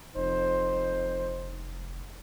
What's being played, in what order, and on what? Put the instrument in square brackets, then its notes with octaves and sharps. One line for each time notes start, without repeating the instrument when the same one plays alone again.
[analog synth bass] F1 [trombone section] F2 D#4 C5